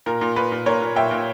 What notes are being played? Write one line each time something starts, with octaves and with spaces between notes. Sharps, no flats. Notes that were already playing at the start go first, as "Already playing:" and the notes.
A#2 A#4
A#2
A#2 B4
A#2
A#2 A#4 C#5
A#2
A#2 E5 G5
A#2